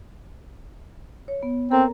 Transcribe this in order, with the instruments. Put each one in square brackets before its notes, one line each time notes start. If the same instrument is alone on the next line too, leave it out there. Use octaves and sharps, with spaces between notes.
[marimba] C#5
B3
[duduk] C4 [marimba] A4 A#4 A#5